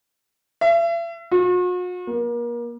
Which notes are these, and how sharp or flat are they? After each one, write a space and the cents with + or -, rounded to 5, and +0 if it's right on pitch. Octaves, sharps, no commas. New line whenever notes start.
E5 +40
F#4 -45
A#3 +35